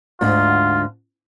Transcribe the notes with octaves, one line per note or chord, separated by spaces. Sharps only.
D2 G#2 D3 F4